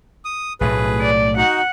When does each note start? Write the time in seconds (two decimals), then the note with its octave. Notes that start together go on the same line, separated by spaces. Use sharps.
0.25 D#6
0.61 B1 A2 A3 G#4 B4
1.01 D5
1.37 D#4 F#4 F#5